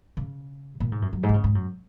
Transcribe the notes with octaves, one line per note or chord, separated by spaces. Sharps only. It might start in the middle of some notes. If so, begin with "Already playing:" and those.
C#3
A#2
G#2
F#2
F#2
G#2
D#3
C#3
G#2
F#2